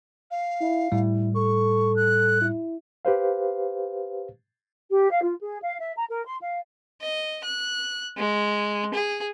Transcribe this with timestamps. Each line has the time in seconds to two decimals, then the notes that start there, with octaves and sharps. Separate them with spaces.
0.31 F5
0.61 E4
0.92 A2 G3 E4
1.35 A4 C#6
1.96 F#6
2.41 E4
3.05 G4 B4 C5 F5
4.91 G4
5.10 F5
5.22 F4
5.40 G#4
5.61 F5
5.79 E5
5.97 A#5
6.09 A#4
6.25 C6
6.41 F5
7.01 D#5
7.45 F#6
8.17 G#3
8.94 G#4